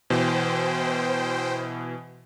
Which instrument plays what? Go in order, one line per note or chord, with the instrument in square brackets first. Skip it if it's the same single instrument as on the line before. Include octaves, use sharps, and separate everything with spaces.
[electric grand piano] B2 E3 [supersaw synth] C5 G5